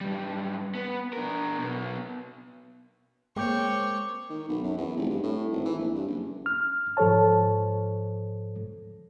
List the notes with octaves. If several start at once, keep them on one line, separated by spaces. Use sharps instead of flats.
G#2 G3
B3
D4 A#4
B1 B2
G#3 A#3 C4 C#5 G5 D6 G6
D#3
B1
F#2
E2
F1
G2
A2
G#1
E3
A#1
G2
F#1
F6
G#2 F3 A4 C5 C#5 A5